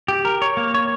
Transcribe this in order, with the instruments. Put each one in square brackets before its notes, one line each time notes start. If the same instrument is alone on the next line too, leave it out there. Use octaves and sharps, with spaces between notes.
[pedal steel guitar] G4
A#4
C#5
A#3
C#5